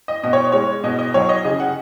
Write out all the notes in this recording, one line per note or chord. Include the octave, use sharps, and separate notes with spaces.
D#5
B2 D#5
C#5
G#3 C#5
B2 D#5
D#5
F#3 C#5
D#5
C#3 D#5
F#5